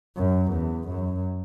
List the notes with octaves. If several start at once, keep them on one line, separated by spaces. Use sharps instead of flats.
F#2
E2
F#2